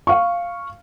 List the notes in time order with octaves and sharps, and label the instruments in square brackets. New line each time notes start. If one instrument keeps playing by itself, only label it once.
[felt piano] F5 C#6